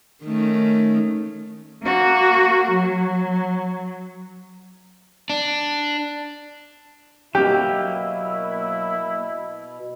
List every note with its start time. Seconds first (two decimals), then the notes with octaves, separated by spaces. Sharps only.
0.24 D#3 A3 C#4
1.83 A#3 F#4
2.71 F#3
5.30 D4
7.35 B2 F#3 A#3 E4 G4